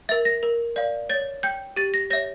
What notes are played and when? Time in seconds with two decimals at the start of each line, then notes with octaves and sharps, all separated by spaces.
0.09 A#4 E5 A6
0.25 A#6
0.43 A#4
0.76 D5 F5
1.09 C#5 A6
1.43 G5 G6
1.76 G4 A6
1.94 A#6
2.10 C#5 E5 A#6